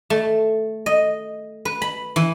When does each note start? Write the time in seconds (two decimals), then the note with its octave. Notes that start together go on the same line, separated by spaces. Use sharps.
0.10 A3
0.86 D#5
1.65 B4
1.82 B5
2.16 E3